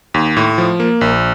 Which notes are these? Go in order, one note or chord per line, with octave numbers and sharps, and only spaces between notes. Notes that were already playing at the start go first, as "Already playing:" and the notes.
D#2
A2
F3
A#3
A#1